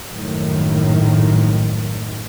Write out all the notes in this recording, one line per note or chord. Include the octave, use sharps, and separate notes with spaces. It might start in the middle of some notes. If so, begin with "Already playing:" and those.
A#1 F#2 A2 D#3